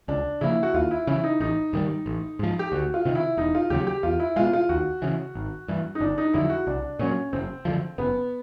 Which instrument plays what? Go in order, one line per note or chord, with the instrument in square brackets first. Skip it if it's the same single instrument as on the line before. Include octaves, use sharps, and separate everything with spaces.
[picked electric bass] C#2 [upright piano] D4
[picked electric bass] C#3 F3 A#3 [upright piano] E4
[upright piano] F#4
[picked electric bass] D#2 [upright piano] F4
[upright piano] E4
[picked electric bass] C#3 E3 [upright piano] E4
[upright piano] D#4
[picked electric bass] A1 [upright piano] D#4
[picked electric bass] G2 D#3 G3
A1
G#2 F3
[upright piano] G4
[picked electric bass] D2 [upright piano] F#4
[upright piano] F4
[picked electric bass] C3 D#3
[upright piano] E4
[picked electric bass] E1 [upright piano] D#4
[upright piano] F4
[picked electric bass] D#2 C#3 F#3 [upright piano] G4
[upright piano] G4
[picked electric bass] E2 [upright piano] F4
[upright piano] E4
[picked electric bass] B2 G#3 [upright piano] F4
[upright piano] F4
[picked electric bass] D#2 [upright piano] F#4
[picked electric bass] C#3 E3
G#1
G2 E3
[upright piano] D#4
[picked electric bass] G1 [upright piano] D4
[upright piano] D#4
[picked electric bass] F2 D3 F#3 [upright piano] E4
[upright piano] F#4
[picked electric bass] C2 [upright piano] D4
[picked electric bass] A#2 F#3 [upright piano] C#4
[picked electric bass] F#1 [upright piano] C4
[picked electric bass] F#2 D3 F3
[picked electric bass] F#1 [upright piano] B3